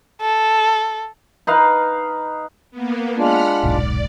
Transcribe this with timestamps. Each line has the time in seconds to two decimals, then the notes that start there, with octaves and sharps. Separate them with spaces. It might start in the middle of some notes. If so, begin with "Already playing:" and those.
0.21 A4
1.47 D#4 B4 F5
2.71 A#3 B3
3.18 G#3 D4 F4 F#5 B5 F6
3.63 D#1 B1 G#2 D5